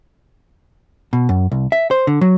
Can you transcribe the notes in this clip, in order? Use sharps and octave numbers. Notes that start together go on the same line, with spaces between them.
B2
F#2
C2
E5
C5
D3
F#3